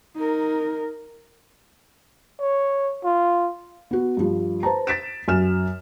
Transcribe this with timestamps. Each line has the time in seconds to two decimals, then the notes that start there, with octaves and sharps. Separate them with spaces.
0.16 D#4 A#4
2.40 C#5
3.04 F4
3.91 B3 F#4
4.17 G2 F3
4.63 B4 C5 A5 A#5
4.87 A6 B6 D7 E7
5.28 F#2 G#5 F6 E7